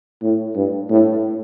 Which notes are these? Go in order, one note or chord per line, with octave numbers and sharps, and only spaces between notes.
A2
G2
A2